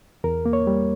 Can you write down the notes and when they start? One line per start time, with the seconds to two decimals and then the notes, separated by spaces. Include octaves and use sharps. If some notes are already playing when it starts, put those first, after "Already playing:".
0.24 E2 A#4
0.46 A#3
0.53 C#5
0.67 G3